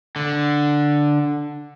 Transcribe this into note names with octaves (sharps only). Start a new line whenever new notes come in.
D3